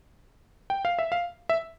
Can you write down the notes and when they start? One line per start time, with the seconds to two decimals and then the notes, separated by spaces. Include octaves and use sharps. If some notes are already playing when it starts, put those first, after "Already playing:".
0.70 G5
0.85 F5
0.99 E5
1.12 F5
1.49 E5